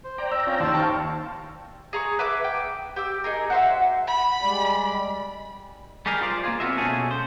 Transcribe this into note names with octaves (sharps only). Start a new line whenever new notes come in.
C5
D5 G5 A#5
E6
C4 C#4 F4
D#2 D#3 C5 A5 E6
F5 G5 A5 C#6
G#4 A#5 B5 C#6
B4 E5 D6 F#6
G5
G4 G5 D6 E6
D#4 G#4 A#4
F#4 C5 E5
B5
G3 G#3 D5
G3 G#3 G4 G#4 A#4
F4 C5 D5
A#3 F4 G#4
B3 C4 F4 F#4 D#5 E5
B2 A3 C#4 D4 G#4 A4
C5